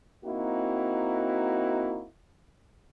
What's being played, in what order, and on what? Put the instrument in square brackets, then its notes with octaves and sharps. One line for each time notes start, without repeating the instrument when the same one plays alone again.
[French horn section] A#3 C4 D#4 E4 F#4